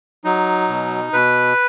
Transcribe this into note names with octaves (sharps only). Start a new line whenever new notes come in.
F#3 D#4
B2
B2 B4